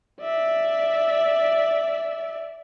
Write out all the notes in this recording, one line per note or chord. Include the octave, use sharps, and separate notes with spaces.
D5 E5